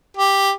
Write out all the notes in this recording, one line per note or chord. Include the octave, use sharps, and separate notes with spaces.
G4